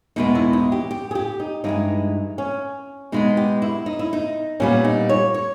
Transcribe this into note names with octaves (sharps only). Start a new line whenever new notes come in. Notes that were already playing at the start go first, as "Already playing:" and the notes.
E2 B2 G#3 B3 D#4
E4
D#4
G4
G4
G#4
G4
D#4
G2 E3 G#3 D#4
C#4
B2 G#3 B3 D#4
G4
E4
D#4
E4
D#4
A#2 G3 B3 C#4
D#4
C#5
C#5